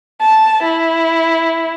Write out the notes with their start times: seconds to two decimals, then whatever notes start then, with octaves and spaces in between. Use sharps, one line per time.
0.22 A5
0.64 E4